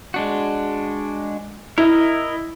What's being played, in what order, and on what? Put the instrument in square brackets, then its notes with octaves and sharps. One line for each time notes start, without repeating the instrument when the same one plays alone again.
[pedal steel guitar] G#3 D4 F#4
[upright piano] E4 [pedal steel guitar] A#4 D#5